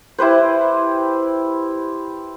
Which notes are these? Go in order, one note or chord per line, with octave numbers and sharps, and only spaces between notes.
E4 G4 B4 C5